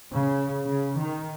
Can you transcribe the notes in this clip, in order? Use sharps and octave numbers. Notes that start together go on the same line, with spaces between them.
C#3
C#3
D#3